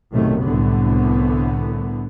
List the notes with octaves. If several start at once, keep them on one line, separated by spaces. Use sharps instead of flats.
B1 F#2 A2 C3 D#3 A3
C2 A2 D3 B3